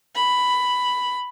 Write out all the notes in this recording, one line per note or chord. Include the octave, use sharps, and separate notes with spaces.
B5